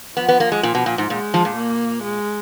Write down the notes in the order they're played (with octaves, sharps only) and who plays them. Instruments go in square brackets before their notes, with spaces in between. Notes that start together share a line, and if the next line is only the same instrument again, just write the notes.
[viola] F3 [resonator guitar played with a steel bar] B3
[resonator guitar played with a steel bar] B3
A#3
G#3
A#2
B2
A#2
G#2
[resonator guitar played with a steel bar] A#2 [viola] G#3
[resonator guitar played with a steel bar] F3
A#2
[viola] A#3
G#3